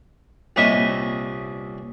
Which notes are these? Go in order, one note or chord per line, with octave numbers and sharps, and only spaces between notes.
C2 A#2 C#4 B4 D#5 E5